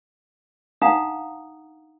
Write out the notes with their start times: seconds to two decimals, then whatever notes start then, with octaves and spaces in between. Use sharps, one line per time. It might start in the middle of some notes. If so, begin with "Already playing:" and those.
0.82 D4 D#4 F5 F#5 A#5 D#6